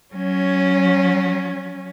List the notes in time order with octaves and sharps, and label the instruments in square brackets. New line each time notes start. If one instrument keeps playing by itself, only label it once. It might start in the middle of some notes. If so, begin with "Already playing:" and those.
[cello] F#3 C#4